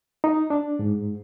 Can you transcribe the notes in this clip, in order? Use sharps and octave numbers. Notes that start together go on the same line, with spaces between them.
D#4
D4
G#2